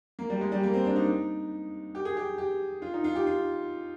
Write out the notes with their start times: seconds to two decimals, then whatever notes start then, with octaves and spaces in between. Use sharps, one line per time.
0.19 A#3
0.30 G3
0.41 G#3
0.52 G3
0.63 A#3
0.74 C4
0.85 D4
0.96 D#4
1.95 G4
2.05 G#4
2.17 G4
2.38 G4
2.82 F4
2.94 D#4
3.04 F4
3.15 G4
3.26 F4